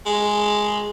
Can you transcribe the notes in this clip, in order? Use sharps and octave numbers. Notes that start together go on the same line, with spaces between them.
G#3